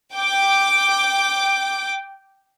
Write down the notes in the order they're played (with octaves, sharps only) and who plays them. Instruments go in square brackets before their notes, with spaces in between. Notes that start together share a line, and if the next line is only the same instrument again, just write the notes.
[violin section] G5 D6